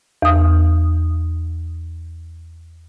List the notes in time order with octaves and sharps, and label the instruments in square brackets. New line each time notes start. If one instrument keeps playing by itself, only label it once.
[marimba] E2 D#6